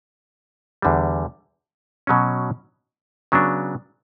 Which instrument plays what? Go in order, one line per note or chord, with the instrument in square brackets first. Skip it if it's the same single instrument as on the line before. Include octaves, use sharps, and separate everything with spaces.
[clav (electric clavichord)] E2 D3 G3
B2 F#3 C#4
C#3 F#3 B3 D4